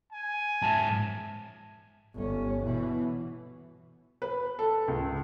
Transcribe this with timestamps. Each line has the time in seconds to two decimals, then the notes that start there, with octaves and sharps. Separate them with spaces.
0.12 G#5
0.62 G#2 E5 A5
2.15 G1 C#4
2.64 B2 E3
4.22 B4
4.59 A4
4.88 C#2